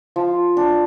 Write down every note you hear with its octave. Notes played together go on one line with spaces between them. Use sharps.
F3
D4